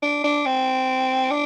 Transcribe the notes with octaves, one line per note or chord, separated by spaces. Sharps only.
D4
D4
C4
D4